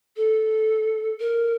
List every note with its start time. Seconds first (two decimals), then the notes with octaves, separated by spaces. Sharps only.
0.16 A4
1.20 A#4